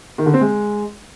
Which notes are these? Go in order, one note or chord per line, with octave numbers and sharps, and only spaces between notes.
D#3
D3
C4
G#3